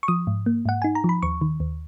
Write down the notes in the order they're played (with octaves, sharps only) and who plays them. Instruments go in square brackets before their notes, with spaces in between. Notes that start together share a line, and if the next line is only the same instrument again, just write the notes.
[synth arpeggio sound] C#6
F3 D#6
G#2
A#3
G#2 F#5
D#4 G#5
A#5
F3 B5
D#2 C#6
D#3
D#2